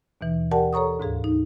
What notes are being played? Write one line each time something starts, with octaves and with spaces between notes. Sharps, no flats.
D#2 B2 E3
G4 A#4 D5 F#5 G5 A5
A4 C#5 A#5 C#6 D#6
D2 G#2 G#4 F5
D#4